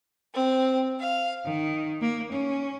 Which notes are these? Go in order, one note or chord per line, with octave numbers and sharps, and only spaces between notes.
C4
F5
D#3
A#3
C#4